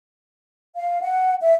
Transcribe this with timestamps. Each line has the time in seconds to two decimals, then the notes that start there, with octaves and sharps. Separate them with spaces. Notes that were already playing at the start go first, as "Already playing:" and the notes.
0.76 F5
1.02 F#5
1.42 E5